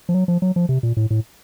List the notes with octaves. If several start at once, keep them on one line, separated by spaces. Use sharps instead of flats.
F3
F#3
F3
F#3
F3
C3
A#2
A2
A2